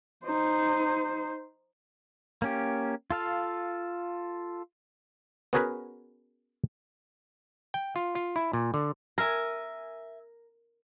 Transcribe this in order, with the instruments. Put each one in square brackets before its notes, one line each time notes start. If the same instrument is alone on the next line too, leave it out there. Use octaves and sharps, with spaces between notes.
[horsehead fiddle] D#4 C5
[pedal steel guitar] A#3 C#4 G4
F4 A4 F5
[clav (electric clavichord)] B3 C#4 F#4 G#4 A#4 B4
G5
F4
F4
E4
A#2
D3
[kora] A#4 [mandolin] E5 G#5